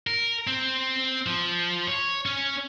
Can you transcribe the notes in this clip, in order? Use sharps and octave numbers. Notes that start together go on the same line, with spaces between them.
A#4
C4
F3
C#5
C#4